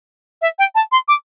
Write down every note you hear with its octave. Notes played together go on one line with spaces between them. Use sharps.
E5
G5
A5
C6
D6